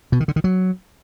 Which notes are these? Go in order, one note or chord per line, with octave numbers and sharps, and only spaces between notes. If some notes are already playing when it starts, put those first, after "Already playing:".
B2
D#3
D3
D#3
F#3